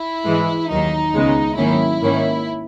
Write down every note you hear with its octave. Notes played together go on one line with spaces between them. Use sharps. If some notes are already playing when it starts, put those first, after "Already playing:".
Already playing: E4
G#2 E3 G#3
D#2 D#3 F#3 D#4
C#2 C#3 G#3 B3
G#2 D#3 F#3 A#3 C#4 E4
G#2 D#3 A#3 C#4